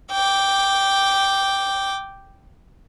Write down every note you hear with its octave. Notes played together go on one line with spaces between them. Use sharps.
G5 D6